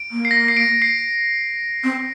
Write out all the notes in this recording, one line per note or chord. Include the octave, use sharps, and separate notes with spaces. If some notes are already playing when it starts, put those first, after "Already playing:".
Already playing: D7
A#3
C7
A#6
C7
D7
C7
C4